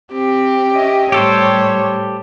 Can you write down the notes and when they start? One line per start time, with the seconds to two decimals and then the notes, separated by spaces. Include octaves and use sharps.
0.12 C4 G4
0.74 C#4 D#5 E5
1.12 A2 G3 G4 A4 C5 C#5